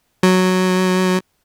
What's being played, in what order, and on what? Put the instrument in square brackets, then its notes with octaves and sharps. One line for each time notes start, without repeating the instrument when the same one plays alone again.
[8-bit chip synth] F#3